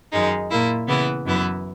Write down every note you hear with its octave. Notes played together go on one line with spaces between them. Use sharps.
F#2 D#3 G#3 D#4
A#2 A#3 E4
C#3 E3 B3 E4
F#2 E3 B3 E4